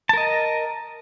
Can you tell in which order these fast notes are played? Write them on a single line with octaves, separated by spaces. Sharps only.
A5 A#4 D#5